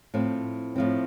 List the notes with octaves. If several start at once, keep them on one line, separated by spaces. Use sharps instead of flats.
A2 F3 C4
A2 F3 C4